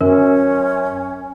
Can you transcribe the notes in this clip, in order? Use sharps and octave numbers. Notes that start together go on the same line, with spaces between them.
F#2 C#4 A#4